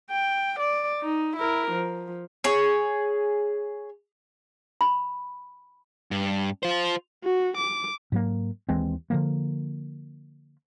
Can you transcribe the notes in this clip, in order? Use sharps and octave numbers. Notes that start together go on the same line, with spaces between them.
G5
D5
D#4
E4 A#4
F3
G#4 C#5
B5
G2
F4 C5
F#4
D6
G#2 F#3 A#3
D#2 E3 G#3 C4
D3 F3 A#3